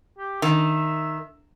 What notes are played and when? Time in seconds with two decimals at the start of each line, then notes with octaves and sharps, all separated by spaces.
0.18 G4
0.42 D#3 E5